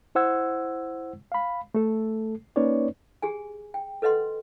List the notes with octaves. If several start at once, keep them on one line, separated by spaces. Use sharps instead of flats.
E4 C5 F#5 E6 G#6
F5 B5
A3 A4
A#3 C#4 D#4 B4 C#5 D5
G4 G#4 G#5
G5
A4 B4 D#5 F#5 C6